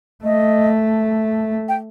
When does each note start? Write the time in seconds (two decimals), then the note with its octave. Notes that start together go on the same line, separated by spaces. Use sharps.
0.24 A3 D#5
1.69 G5